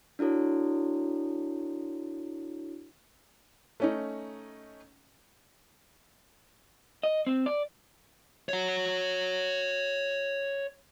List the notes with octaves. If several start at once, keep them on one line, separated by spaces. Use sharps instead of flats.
D4 E4 F#4 A4 C#5
A3 C#4 D#4
D#5
C4
D5
C#5 F#5